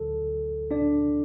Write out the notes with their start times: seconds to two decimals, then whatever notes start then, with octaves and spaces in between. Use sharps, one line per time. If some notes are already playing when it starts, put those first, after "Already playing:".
Already playing: D2 D3 F#3 A4
0.71 D4 D5